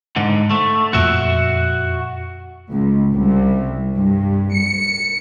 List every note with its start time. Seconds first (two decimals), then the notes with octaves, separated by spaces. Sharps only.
0.16 G#2 D3
0.50 A3
0.93 F2 A#2 F3 F#4 E5
2.71 C#2
3.14 C2
3.96 G2
4.56 C#7